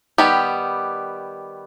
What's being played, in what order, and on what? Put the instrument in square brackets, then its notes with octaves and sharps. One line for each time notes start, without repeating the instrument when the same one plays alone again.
[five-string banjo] D#3 G3 B3 G4